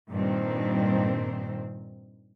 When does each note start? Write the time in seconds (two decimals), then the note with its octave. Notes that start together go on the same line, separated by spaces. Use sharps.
0.10 G2 A#2 D#3 C4